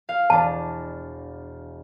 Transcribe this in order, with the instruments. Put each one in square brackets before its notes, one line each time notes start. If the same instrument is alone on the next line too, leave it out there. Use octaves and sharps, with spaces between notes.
[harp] F5
[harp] E1 D4 [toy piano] A5